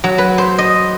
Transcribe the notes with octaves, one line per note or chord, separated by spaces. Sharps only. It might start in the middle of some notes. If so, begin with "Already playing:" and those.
F#3
B4
C5
D#5